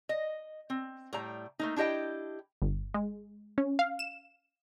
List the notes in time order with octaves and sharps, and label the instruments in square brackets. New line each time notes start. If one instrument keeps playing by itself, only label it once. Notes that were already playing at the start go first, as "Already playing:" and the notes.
[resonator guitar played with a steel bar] D#5
C4
A2 G3 A#5
A3 A#3 D#4
D4 E4 G4 D#5 G5
[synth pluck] G1
G#3
C#4
F5
E7